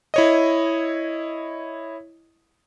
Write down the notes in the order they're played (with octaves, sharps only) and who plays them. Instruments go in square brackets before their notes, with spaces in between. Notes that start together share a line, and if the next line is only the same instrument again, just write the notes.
[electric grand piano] E4 C#5 D#5